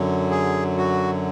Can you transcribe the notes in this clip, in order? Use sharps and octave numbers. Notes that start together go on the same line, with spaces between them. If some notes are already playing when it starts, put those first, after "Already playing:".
Already playing: F#2 D3 F#3
G#4
F#4